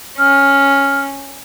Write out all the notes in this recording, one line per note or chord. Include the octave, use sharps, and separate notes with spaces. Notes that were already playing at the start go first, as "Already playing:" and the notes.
C#4 F6